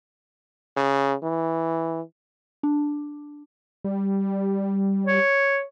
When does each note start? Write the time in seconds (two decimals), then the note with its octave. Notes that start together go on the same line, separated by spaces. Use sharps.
0.77 C#3
1.23 E3
2.63 D4
3.84 G3
5.06 C#5